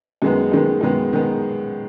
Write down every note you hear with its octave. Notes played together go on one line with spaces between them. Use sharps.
F#2 D#3 G#3 B3
F#2 D#3 G#3 B3
F#2 D#3 G#3 B3
D#3 G#3 B3